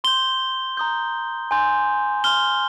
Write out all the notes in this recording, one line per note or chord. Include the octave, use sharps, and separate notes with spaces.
C6 G6 G7
A#5 D#6 G6
G#5 C6 G6
C6 F6 G7